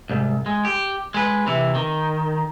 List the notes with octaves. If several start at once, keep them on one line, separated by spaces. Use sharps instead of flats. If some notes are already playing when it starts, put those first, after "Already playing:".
C2 G#2
G#3
G4
G#3 B4
C3 E3
D#3